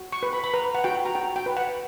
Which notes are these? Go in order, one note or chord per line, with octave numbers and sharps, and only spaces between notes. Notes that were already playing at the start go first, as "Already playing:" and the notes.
Already playing: F#4
C#6
B4
B5
B5
B4 A#5
F#5
F#4 G5
A#5
F#4 G5
G5
B4
F#5